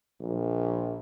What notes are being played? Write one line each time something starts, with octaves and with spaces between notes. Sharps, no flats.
A#1